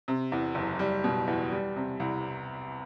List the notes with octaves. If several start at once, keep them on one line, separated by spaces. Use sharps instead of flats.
C3
E2
F#1
G3
B2
E2
G3
C3
C2